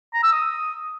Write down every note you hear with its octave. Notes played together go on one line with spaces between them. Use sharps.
A#5
E6
D#6